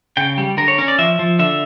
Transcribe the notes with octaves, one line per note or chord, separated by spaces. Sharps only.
C#3 G5
G3
D3 A#4
C#5
C#4 A#4
D5
F3 E5
F3
D3 E5